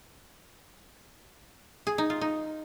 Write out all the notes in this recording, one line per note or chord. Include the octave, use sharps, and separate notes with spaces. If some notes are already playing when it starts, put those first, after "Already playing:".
G#4
D#4
F4
D#4